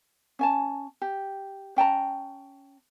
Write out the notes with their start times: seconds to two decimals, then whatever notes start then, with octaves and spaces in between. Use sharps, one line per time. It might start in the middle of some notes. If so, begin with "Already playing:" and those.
0.39 C#4 G#5 A5
1.01 G4
1.76 C#4 G5 A5 A#5